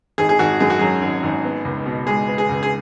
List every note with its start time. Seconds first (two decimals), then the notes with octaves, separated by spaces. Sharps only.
0.18 G#1 G#4
0.29 G#4
0.39 G#1 F#4
0.60 F#2 G#4
0.70 F#4
0.79 F#3 G#4
1.02 G#1
1.23 G#1
1.44 B3
1.65 C#2
1.86 B2
2.07 G#3 G#4
2.27 B3
2.38 G#4
2.49 C#2
2.63 G#4